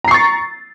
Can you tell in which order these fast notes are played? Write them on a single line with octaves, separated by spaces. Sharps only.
A#5 C7 C#6 A6